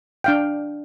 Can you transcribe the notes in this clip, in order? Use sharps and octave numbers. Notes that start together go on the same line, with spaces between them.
D4 F5 G5